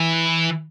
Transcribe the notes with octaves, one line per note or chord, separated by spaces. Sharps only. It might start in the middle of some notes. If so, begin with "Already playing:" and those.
Already playing: E3